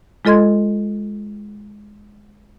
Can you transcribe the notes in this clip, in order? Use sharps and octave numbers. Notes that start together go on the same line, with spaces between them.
G#3 F4 A4 D#5 C6 G#6